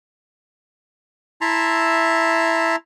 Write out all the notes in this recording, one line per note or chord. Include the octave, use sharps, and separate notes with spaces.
E4 E5 A5 A#5 C6